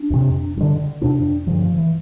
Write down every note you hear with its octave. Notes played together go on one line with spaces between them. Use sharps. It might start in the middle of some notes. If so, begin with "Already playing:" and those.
Already playing: D4
F2 C3
G2 D3
F2 C3 D4
G2 D3 F3
F3
E3